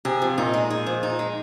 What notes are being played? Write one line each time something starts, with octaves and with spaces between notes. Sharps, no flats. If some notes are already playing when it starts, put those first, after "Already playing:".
C3 G#4
F3
A#2 D#4
G#3
G#4
F3
D#4
G#3